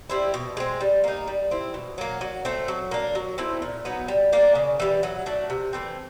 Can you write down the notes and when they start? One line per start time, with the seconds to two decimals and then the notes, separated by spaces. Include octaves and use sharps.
0.10 G3 C4 E4
0.34 B2
0.57 G#3 C4
0.81 G3
1.04 A#3 D#4
1.27 G3
1.51 C4 E4
1.74 B2
1.98 F#3 A#3
2.21 F#3
2.45 A3 C4
2.68 F#3
2.91 A#3 D4
3.15 F#3
3.38 A3 C4 E4
3.62 A#2
3.85 F#3 B3 D#4
4.08 G3
4.33 A#3 D4
4.55 C#3
4.80 E3 G3
5.03 F#3
5.26 A3 D4 F#4
5.50 C3
5.73 E3 A3 C4